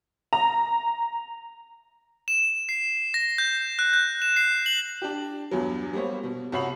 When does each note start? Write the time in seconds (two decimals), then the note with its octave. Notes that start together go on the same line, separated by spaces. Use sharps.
0.33 A#5
2.28 E7
2.69 C7
3.14 A#6
3.38 G6
3.79 F#6
3.93 G6
4.22 E7
4.36 C7
4.66 F#7
5.02 D4 G4
5.51 E2 G2 F#3
5.93 G3 A#3 B3 C5 C#5
6.23 B2
6.52 C2 F#4 C#5 B5 C7 F#7